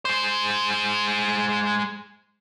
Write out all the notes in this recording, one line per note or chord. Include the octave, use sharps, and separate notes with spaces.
G#3 C5